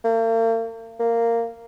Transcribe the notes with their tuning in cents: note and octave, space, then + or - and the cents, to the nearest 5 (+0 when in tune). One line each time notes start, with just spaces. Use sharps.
A#3 -45
A#3 -10